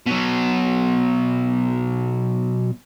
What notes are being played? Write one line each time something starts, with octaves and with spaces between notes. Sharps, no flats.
B2 F#3